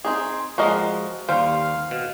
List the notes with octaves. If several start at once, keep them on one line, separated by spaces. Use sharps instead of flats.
C4 D#4 G#4
F3 G#3 F#4 A#4 D#5
D#2 G3 C5 F5
B2